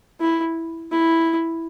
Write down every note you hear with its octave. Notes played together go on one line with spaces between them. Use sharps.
E4
E4